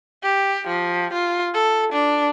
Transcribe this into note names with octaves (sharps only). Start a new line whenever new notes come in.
G4
F3
F4
A4
D4